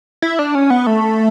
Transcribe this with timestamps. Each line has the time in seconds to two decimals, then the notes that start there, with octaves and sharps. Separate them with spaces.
0.22 E4
0.39 D4
0.55 C#4
0.70 B3
0.87 A3